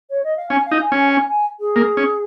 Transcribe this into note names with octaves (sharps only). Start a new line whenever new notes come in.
C#5
D#5
F5
C#4 G#5
F5
D#4
G#5
C#4
G#5
G#5
G#5
G#4
A#3
C#4